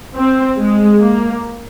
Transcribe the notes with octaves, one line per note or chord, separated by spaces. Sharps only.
C4
G#3
A#3